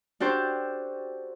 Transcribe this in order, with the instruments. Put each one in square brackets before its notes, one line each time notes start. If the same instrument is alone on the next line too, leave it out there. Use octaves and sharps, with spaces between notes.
[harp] D4 F#4 G4 A4 C5